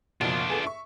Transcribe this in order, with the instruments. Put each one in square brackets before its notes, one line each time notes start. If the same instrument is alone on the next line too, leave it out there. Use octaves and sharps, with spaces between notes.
[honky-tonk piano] F#1 B2 F3 [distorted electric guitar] D4 F4
[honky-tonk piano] B3 G#4 A4
E5 C#6